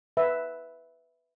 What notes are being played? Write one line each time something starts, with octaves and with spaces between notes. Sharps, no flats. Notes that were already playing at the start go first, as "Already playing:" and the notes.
B4 E5